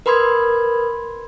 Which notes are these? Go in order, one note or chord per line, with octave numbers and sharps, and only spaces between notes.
A#4 B4 B5 C6 D#6 G#6